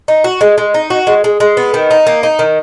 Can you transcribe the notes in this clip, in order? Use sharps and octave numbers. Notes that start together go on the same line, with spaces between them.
D#4
F#4
G#3
G#3
D#4
F#4
G#3
G#3
G#3
B3
D#3
D#4
A#3
D#4
D#3